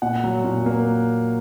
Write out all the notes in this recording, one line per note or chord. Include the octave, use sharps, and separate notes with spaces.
A#2 F#5
F#3
A#2
A#3